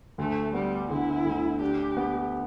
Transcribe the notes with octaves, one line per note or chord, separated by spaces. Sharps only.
D2 A3
G3 B3
D3 E4
D2
D4 G4
B3